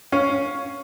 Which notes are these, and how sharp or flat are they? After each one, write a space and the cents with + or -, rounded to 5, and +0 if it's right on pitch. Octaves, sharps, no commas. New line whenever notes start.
C#4 +0 F5 +10